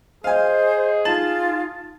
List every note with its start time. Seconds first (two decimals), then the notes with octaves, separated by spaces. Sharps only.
0.24 G#4 C5 D#5 F5 G#5
1.05 D#4 F4 A5